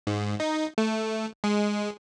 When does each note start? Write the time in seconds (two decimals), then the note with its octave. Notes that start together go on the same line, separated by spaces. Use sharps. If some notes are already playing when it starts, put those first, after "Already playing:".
0.07 G#2
0.40 D#4
0.78 A3
1.44 G#3